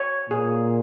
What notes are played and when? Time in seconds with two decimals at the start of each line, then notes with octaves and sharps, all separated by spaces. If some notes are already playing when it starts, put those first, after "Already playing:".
Already playing: C#5
0.30 A#2 G#4